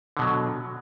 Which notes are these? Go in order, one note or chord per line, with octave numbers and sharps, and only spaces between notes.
B2 D3 F#3